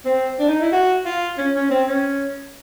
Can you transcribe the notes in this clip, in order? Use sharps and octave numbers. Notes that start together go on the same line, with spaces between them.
C4
D4
D#4
E4
F#4
F4
C#4
C#4
C4
C#4